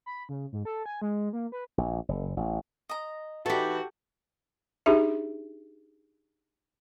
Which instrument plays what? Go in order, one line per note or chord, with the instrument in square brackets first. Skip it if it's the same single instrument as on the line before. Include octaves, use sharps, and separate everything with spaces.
[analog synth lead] B5
C#3
G#2
A4
G#5
G#3
A#3
B4
[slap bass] A#1
F#1
A1
[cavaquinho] D#5 A#5
[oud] E3 D#4 [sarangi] F#4 [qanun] G4 A4 [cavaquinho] A5 B5
[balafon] D4 D#4 G4 G#4 E5